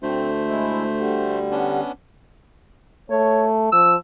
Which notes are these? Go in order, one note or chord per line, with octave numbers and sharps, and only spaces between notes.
D2 A3 C4 C5
G#3 E4
D3 G3
B3 C#4 D4
A3 C#5
F3 E6